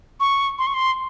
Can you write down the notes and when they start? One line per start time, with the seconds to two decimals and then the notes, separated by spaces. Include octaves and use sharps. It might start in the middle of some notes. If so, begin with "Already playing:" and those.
0.20 C#6
0.59 C6
0.67 C#6
0.74 C6